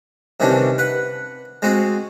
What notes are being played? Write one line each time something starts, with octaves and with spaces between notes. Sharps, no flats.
C3 D#3 E3 G3 C#4 D4
B4 F#5
G#3 C4 F#4 G#4